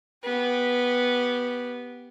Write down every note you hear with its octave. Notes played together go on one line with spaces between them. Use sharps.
B3 G4